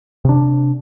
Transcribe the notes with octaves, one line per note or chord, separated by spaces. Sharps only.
C3 D4